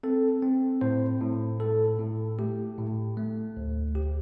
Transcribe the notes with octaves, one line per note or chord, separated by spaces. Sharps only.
C4 A4
C4
A2 C5
A2
A2 A4
A2
A3 G4
A2
A3
D2
D2 G4